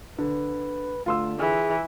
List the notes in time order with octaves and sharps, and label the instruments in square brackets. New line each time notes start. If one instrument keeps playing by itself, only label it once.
[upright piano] D3 [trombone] B4
[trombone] D3 [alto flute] A3 [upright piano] F4 C6 E6
[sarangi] E3 [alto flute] G#4